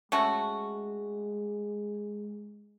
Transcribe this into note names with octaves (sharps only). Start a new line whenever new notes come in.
G#3 A3 C#4 F#4